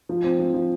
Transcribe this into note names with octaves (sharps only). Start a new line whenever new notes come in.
F3
C4
F3
F3